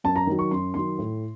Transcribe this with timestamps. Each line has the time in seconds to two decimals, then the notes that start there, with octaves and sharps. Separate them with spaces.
0.04 F#2 A5
0.16 A#5
0.27 D#3 F#3
0.39 C#6
0.51 F#2 C6
0.74 D#3 F#3 C6
0.99 A2